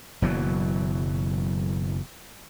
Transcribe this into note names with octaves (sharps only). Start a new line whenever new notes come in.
F#1 B2 E3 F#3